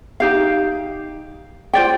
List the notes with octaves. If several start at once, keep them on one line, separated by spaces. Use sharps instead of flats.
D#4 G4 F5
F4 C5 D5 G5